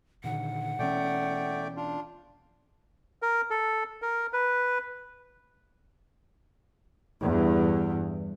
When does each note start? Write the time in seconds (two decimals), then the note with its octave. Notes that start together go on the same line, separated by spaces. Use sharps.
0.24 A#2 D3 D#3 F#5
0.79 B2 E3 A3 C#4 D5 G5
1.77 D4 F4
3.22 A#4
3.50 A4
4.02 A#4
4.33 B4
7.23 E2 G2